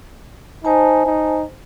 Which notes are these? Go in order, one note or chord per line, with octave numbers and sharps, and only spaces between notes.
D#4 C5 G#5 A5
D#4